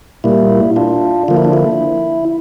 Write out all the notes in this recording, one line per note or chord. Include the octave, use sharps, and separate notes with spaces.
A#2 G3 A#3 E4
D4 F4
D3 F3 A#3 F4
E4
D4
E4